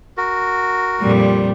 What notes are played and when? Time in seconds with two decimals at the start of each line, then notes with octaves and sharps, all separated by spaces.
0.17 F#4 A#4
1.01 F2 A#2 G3